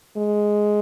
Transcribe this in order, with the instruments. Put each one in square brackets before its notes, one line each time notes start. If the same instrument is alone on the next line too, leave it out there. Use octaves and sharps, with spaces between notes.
[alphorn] G#3